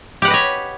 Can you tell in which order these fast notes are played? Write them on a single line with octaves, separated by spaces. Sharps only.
G4 F#5 B4 D#5 C#5